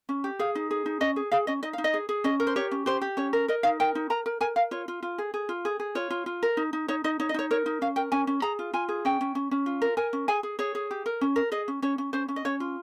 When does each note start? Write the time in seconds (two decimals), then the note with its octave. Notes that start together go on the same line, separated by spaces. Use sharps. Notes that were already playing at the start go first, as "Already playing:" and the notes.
0.09 C#4
0.24 G4
0.39 G#4 F5
0.55 D#4
0.71 G#4
0.86 D#4
1.01 C#4 D#5
1.16 G#4
1.32 G#4 F5
1.47 C#4 D#5
1.63 D#4 D#5
1.73 F5
1.78 D#4
1.84 D#5
1.94 G#4
2.09 G#4
2.24 C#4 D#5
2.40 A#4
2.47 C5
2.56 G4 C#5
2.71 C#4
2.86 G4 C5
3.01 G4
3.17 C#4 C#5
3.33 A#4
3.48 A#4 D#5
3.63 D#4 F5
3.80 A#4 G5
3.95 D#4
4.10 A#4 A#5
4.26 A#4
4.41 A#4 G#5
4.56 A#4 F5
4.71 F4 C#5
4.88 F4
5.03 F4
5.18 G#4
5.34 G#4
5.49 F4
5.65 G#4
5.80 G#4
5.95 F4 C#5
6.10 F4
6.26 F4
6.43 A#4
6.57 D#4
6.73 D#4
6.88 D#4 C#5
7.04 D#4 D#5
7.20 D#4 C#5
7.29 D#5
7.34 D#4 C#5
7.51 A#4 C#5
7.66 D#4
7.81 C#4 F5
7.96 A#4 G5
8.12 C#4 G#5
8.27 C#4
8.42 G#4 A#5
8.59 F4
8.73 F4 G#5
8.89 G#4
9.05 C#4 G5
9.21 C#4
9.35 C#4
9.51 C#4
9.66 F4
9.82 A#4
9.97 A#4 G#5
10.13 C#4
10.28 G#4 G#5
10.43 G#4
10.59 G#4 C#5
10.75 G#4
10.91 G4
11.06 A#4
11.21 C#4
11.36 A#4
11.52 G#4 D#5
11.68 C#4
11.82 C#4 C#5
11.98 C#4
12.13 C#4 C5
12.28 C#4
12.36 D#5
12.45 C#4 C#5
12.60 F4